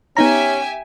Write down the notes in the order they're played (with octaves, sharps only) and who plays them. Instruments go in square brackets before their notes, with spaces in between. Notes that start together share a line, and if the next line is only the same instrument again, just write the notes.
[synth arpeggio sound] B3 D#4 A#5 [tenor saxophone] C#4 [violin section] G4 E5 G#5